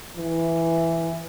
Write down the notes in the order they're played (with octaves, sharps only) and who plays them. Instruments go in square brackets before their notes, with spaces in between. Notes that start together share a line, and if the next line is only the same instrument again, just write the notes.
[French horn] E3